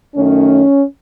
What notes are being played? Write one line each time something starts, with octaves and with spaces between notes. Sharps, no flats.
F#2 D#3 A3 C#4